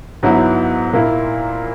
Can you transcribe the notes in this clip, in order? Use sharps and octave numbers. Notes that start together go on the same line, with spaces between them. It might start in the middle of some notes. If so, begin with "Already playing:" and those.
G#2 F#3 B3 E4
A#2 A#3 E4